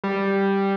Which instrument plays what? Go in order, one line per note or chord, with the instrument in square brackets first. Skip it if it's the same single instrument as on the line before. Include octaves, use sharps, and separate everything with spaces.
[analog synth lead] G3